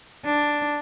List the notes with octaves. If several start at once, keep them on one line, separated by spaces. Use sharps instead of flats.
D4